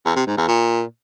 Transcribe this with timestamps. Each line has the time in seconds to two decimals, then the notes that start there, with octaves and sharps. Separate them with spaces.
0.05 E2
0.16 C3
0.27 G#2
0.37 E2
0.48 A#2